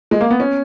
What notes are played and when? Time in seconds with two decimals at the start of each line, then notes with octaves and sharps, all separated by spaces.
0.11 G#3
0.21 A#3
0.31 B3
0.40 C#4